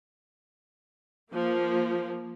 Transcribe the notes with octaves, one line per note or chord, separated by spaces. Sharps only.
F3 A#3